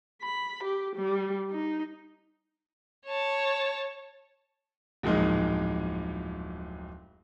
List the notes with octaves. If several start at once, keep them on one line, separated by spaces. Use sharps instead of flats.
B5
G4
G3
D#4
C#5 A5
D1 F2 A#2 G#3 D#4